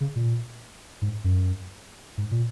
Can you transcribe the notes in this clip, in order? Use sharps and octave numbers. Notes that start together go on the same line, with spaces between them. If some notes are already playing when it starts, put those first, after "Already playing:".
C#3
A#2
G#2
F#2
G#2
A#2